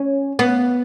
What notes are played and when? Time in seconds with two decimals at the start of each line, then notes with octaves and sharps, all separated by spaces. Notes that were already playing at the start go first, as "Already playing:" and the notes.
Already playing: C#4
0.39 B3